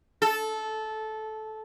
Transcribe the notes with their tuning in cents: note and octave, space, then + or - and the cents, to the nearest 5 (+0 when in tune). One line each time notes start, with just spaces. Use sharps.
A4 -15